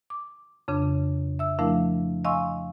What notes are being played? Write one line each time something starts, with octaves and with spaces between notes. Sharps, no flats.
D6
F2 C#3 D4
E5 E6
F3 A3 D4 E4 A#4 F5
D#5 F5 G#5 C6 C#6 E6